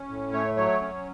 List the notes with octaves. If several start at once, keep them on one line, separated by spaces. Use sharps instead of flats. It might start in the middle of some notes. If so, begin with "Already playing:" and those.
Already playing: C#4
A2
A3 C#5
F#3 C#5
C#4